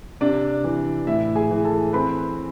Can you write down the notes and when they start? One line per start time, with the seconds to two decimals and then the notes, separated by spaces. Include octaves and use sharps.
0.21 C3 D4 D5
0.64 E3
1.07 A2 E4 E5
1.35 G#4 G#5
1.51 E3
1.64 A4 A5
1.93 C4 B4 B5